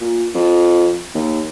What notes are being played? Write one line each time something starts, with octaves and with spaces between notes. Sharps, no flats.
A#2
F2
D#2